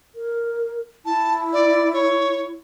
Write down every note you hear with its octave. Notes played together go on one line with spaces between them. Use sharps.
A#4
E4 A5
D5
C#5